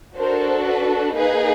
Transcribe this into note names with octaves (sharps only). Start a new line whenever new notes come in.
D4 F#4 A4 A#4 C5
B4
A#3 D#4 G#4 B4